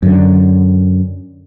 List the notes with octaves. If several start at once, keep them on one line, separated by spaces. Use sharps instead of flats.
F#2 D3